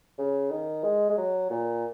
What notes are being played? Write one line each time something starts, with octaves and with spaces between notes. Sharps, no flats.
C#3
D#3
G#3
G#3
F#3
A#2